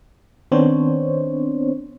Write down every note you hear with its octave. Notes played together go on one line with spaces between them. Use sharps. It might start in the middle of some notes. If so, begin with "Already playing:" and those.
D#3 B3 C4 D4 C5 C#5